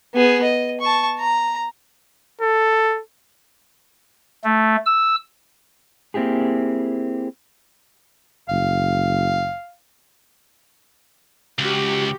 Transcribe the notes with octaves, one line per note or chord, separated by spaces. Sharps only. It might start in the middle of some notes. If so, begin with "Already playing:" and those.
B3 G#4
D#5
A5 C#6
A#5
A4
A3
E6
A#3 C4 E4 G4 G#4
F#1 F5
C#2 F#4 G4